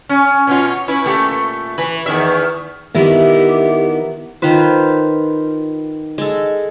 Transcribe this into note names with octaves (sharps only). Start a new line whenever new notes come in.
C#4
B2 C#4 F4
C#4 E4 B4
A#2 A3 G4
E3 B4
E2 D#3 E5
D#3 B3 E4 G4
D#3 F4 B4 C5
G#3 A4